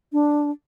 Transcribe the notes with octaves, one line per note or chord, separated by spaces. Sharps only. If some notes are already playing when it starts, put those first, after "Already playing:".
D4